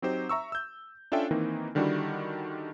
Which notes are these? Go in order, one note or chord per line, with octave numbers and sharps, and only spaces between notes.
F#3 C4 D#4 G4 C5
E5 A#5 C#6 E6
E6 G6
C#4 D4 F4 A4 E5 G5
D#3 E3 A#3 C4 D#4
D3 D#3 G3 D4 E4 F#4